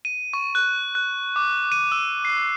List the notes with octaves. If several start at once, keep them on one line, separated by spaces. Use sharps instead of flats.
D#7
C#6
F#6
F#6
D6
D#7
E6
C7